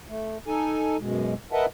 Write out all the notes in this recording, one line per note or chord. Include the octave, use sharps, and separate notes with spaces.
A3
D#4 A4 G#5
F#2 B2 G#3
A#4 B4 D#5 E5 F#5 A5